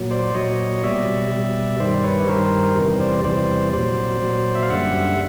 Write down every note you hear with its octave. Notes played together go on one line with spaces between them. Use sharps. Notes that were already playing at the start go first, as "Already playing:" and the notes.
Already playing: A#2 F#3
C5 D5
A#2 F#3 C#5 D#5
B2 G3 D5 E5
B2 G3
G2 D#3 G3 C5 D5
B4 C#5
G2 D#3 G3 A#4 C5
E2 C3 E3 G3
C5 D5
E2 C3 E3 G3 C5 D5
A#2 F#3 C5 D5
A#2 F#3
E5
F5
F#2 D3 G3 E5 F#5